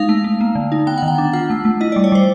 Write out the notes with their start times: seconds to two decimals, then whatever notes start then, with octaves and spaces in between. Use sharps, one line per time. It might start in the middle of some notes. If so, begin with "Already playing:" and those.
Already playing: G#3 D#4 F5
0.09 A3
0.24 A3
0.41 A#3
0.55 D3
0.72 D#4
0.87 B3 G5
0.98 D#3 F#5
1.08 G5
1.18 D4
1.33 F4 F#5
1.50 A3
1.65 A3
1.81 E4 D#5
1.92 G3 D5
2.04 C#5
2.12 G3 C5